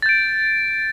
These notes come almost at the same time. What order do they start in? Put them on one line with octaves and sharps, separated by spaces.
A6 G6 D7